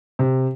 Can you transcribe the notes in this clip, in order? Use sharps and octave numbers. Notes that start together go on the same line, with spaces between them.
C3